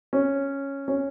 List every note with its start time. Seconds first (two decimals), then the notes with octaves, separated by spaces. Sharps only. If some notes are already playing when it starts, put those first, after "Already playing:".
0.13 C#4
0.88 C#4